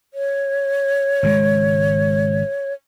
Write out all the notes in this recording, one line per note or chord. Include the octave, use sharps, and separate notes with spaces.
C#5
G#1 C#3 G#3